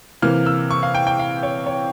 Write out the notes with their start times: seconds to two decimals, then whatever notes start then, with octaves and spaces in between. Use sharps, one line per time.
0.22 C3 E3 A#3 F6
0.46 E6
0.71 C#6
0.83 F5
0.95 G5
1.07 G5
1.19 F5
1.43 C#5
1.66 C#5